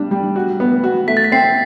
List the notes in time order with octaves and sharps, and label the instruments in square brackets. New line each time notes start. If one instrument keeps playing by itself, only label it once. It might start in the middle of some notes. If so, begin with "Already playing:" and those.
Already playing: [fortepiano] G3 D4
G3
F#4
B3
F#4
[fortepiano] A3 [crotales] B6
[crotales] A6
B6
[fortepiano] C4 [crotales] C7